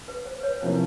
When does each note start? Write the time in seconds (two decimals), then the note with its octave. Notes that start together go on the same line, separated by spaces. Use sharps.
0.08 B4
0.25 C5
0.43 B4 C#5
0.61 C3 F3 A#3 C#4 E4 C5